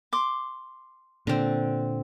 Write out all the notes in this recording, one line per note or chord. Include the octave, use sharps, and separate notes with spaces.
C6 D6
A#2 D3 C4